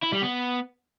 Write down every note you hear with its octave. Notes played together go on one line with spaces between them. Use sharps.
E4
G3
B3